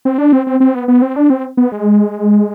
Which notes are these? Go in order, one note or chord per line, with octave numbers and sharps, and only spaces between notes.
C4
D4
C4
C4
C4
B3
B3
C4
D4
C4
B3
G#3